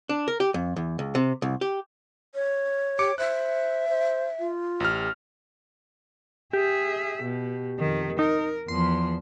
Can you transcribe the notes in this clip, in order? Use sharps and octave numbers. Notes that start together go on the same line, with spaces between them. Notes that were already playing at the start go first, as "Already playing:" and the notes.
D4
A#4
G4
F2
E2
C#2
C3
C2
G4
C#5
G4 D6 C#7
C5 E5 F#6
C5
F4
A1 G4 F6
G4 G#4 E5
B2
F2 D#3
D#4 A#4
E2 F3 C6